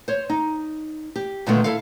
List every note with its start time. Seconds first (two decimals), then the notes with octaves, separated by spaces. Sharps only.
0.08 C5 C#5
0.30 D#4
1.16 G4
1.46 A#2 D3 D#3 G#3 A3 B3
1.64 E4 A4 F5